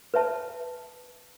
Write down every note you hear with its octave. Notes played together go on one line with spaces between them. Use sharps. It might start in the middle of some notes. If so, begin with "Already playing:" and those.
B4 C#5 E5 A5